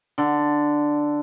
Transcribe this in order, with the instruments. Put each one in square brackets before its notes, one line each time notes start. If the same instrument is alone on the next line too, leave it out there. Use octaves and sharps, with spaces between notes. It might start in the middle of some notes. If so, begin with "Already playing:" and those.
[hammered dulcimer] D3